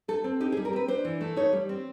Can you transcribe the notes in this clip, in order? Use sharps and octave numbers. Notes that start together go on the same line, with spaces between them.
A3 A4
C4
D#4 G4
G#4
G3
A#4
C4 B4
D4 C5
E3
A3
D#4 C#5
G3
C4